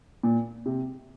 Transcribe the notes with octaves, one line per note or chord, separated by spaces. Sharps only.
A#2
C3